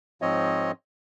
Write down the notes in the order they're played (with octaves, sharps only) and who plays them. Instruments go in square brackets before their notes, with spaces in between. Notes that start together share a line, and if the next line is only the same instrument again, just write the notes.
[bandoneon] G#2 F3 C4 C#5 D#5